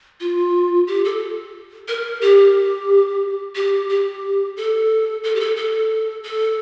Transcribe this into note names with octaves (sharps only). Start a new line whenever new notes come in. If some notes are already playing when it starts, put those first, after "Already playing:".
F4
G4
A4
A#4
G4
G4
G4
A4
A4
G4
A4
A4
A4